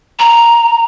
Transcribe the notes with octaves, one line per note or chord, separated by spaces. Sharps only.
A#5